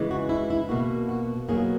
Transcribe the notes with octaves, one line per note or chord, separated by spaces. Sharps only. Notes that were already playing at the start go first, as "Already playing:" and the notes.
Already playing: C#3 E3 G#3
F#4
E4
E4
B2 A#3 F#4
F#4
B2 F#3 A#3 G#4